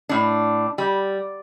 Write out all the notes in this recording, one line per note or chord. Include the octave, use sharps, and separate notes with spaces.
A2 D4
G3